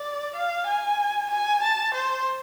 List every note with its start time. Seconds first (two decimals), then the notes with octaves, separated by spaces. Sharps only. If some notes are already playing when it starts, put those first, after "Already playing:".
Already playing: D5
0.35 F5
0.67 G#5
1.31 G#5
1.62 A5
1.94 C5